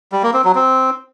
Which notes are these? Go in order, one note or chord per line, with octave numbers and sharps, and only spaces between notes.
G3
A#3
C4
F#3
C4